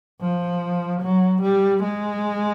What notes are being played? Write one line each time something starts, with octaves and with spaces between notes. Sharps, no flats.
F3
F#3
G3
G#3